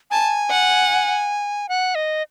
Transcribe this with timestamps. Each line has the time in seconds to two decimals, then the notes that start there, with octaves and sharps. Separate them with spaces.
0.11 G#5 A5
0.51 F#5
1.69 F#5
1.95 D#5